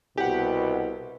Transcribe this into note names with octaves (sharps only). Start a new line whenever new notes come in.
C2 B2 G4 F#5